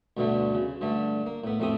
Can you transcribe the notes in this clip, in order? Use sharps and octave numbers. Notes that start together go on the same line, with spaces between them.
D2 G2 B2 D3 A3
C#3
G2 D3 A3
A#3
A2 B3
F2 A2 A3 C4 G4 D#6